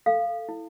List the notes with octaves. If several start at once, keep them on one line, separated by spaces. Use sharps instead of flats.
A4 F5
E4